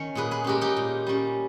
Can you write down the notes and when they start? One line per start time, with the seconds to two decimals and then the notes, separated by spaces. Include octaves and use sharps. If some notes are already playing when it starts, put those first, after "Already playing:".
Already playing: D#3 C#4 C#5
0.15 A#2 G#4 B4
0.31 G#4 B4
0.44 G#3 C#4 G4 A#4
0.61 D#4 G4
0.77 A#2
1.07 G3 C#4